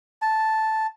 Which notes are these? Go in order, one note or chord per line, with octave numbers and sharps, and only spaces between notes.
A5